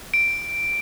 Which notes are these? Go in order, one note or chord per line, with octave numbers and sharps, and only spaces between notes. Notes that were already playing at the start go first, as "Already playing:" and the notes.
D7